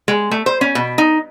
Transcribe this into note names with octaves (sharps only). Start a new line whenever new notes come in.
G#3
A3
C5
C#4
B2
D#4